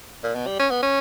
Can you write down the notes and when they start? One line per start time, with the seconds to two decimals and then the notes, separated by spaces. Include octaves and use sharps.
0.23 A#2
0.35 B2
0.46 G3
0.59 C#4
0.70 B3
0.82 C#4